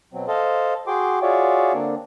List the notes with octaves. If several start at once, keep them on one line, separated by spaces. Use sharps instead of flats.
B2 F#3 C4
A4 C5 D#5 F5
F#4 G#4 G5 C6 D6
F4 F#4 G#4 C#5 D5 E5
D3 A#3 C4 D4